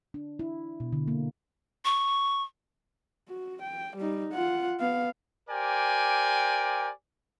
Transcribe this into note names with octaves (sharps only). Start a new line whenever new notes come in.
D4
E4
B2
D3
A#3
C#6
F#4
G5
G3 D#4
F4 F#5
B3 F5
G4 A#4 C5 D5 G5 G#5